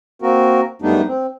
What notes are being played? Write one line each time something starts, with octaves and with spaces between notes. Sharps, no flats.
A#3 C4 F#4 A#4
F#2 G3 A3 B3 D4 D#4
C4